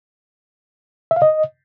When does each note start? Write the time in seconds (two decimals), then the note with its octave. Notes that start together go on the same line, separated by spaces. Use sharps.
1.11 E5
1.16 F5
1.22 D#5